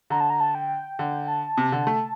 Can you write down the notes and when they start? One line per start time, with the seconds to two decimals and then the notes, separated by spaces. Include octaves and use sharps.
0.10 D3 A#5
0.20 A5
0.30 A#5
0.40 A5
0.55 G5
0.99 D3
1.28 A5
1.58 C3
1.72 D3
1.87 A3